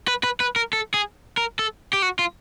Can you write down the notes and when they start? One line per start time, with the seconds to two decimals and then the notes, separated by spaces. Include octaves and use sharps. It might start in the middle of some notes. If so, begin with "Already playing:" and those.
0.08 B4
0.24 B4
0.40 B4
0.56 A#4
0.73 A4
0.94 G#4
1.37 A#4
1.59 A4
1.93 G4
2.02 F#4
2.19 F4